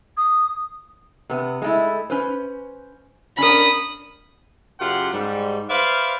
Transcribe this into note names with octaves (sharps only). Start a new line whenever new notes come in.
D#6
C3 B3
G#3 A3 E4
C#4 B4 C5
C#4 D4 A#4 B5 D#6
F#2 C#3 F4 G4 F#5 C6
G#2 G3
B4 C5 D5 E5 F5